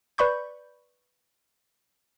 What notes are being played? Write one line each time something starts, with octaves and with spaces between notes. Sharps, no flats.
B4 D5 B5 C#6 G6